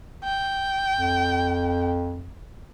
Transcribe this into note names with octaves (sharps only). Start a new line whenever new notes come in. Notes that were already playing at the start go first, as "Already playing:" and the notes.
G5
F2